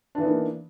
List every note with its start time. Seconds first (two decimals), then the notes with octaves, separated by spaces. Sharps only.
0.15 D4
0.18 E3
0.21 B3
0.24 D#4
0.27 A#3